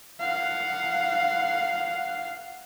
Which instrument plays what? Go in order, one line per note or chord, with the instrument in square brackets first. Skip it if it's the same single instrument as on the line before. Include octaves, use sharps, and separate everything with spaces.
[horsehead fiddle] F5 F#5